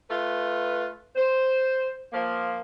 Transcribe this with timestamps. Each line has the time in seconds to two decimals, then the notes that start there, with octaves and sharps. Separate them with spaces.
0.08 A3 F4 B4
1.16 C5
2.13 F3 A#3